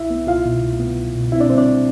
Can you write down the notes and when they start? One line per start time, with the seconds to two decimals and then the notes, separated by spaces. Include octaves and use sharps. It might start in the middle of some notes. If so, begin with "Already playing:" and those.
Already playing: C2 E4 E5
0.10 B3
0.27 C2 F4 F5
0.45 B2
0.62 C2
0.79 B3
0.97 C2
1.15 B2
1.32 C4 E4 E5
1.40 D4 D5
1.50 G3 C4 C5
1.58 D4 D5